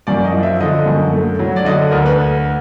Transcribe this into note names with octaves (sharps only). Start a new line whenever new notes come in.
F#2 D5
D#5
F3
E5
D3 D#5
F#2
A3
F#3
D5
D3 D#5
D2 A#4
B4